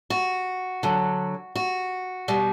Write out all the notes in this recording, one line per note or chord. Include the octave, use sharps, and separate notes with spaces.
F#4
D3 F#3
F#4
B2 G3